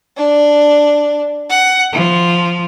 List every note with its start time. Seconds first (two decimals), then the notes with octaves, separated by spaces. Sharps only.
0.16 D4
1.49 F#5
1.94 F3